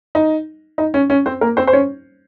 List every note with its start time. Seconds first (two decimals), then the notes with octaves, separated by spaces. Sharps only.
0.15 D#4
0.78 D#4
0.94 C#4
1.10 C#4
1.26 C4 C5
1.41 A#3 A#4
1.57 C4 C5
1.67 C5
1.73 C#4 C#5